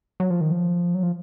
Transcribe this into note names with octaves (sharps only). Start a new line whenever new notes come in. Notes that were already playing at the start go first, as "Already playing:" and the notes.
F#3
F3
D#3
F3
F#3
F3